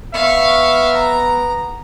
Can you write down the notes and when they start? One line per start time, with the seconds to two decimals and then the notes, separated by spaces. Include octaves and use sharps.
0.14 B3 E5 F5 C#6
0.92 A#5